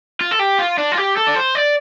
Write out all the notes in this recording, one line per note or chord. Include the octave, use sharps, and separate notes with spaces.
F4
A4
G4
F4
D4
F4
G4
A4
D5
C5
D5